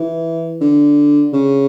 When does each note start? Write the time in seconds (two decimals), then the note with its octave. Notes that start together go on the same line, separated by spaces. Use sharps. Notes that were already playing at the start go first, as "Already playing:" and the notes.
Already playing: E3
0.61 D3
1.33 C#3